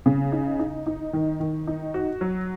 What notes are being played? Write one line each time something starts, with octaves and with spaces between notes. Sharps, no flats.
C#3
D#4
D#4
D#4
D#3
D#3
D#4
F#4
F#3